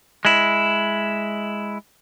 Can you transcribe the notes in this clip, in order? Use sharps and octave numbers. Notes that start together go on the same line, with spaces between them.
G#3 E4